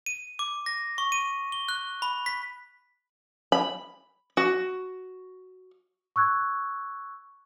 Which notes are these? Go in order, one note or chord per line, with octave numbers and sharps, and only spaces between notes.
D#7
D6
A#6
C#6
D#7
G7
F#6
B5
B6
B5
F#4
C#6 E6 F#6 G#6